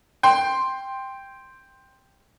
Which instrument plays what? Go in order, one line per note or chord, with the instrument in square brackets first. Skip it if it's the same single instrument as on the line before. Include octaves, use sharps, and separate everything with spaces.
[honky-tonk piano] G5 C6